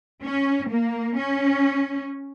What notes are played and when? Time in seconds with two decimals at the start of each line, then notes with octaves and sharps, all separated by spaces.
0.22 C#4
0.68 A#3
1.16 C#4